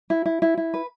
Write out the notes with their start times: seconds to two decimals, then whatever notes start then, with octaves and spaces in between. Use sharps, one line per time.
0.10 E4
0.26 E4
0.42 E4
0.57 E4
0.74 B4